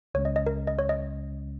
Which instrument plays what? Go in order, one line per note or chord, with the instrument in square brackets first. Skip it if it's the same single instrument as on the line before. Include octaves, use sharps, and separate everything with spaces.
[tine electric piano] C#2 C#3 G#3 C#4 [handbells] C#5
[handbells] D#5
D#5
A#4
D#5
C#5
D#5